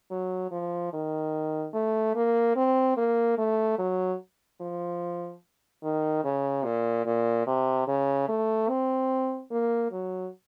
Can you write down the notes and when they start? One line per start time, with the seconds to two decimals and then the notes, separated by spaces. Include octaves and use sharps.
0.11 F#3
0.52 F3
0.93 D#3
1.74 A3
2.15 A#3
2.56 C4
2.97 A#3
3.38 A3
3.78 F#3
4.61 F3
5.83 D#3
6.24 C#3
6.65 A#2
7.06 A#2
7.47 C3
7.88 C#3
8.29 A3
8.69 C4
9.51 A#3
9.92 F#3